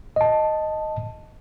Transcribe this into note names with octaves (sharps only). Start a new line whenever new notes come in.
D#5 A5